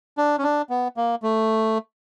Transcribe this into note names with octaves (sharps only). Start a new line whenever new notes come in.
D4
C#4
D4
B3
A#3
A3